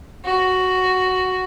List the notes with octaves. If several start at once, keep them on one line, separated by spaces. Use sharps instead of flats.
F#4